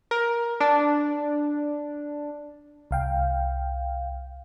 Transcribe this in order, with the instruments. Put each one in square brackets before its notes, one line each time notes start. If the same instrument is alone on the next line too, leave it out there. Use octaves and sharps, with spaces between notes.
[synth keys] A#4
D4
[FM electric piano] C2 F5 G5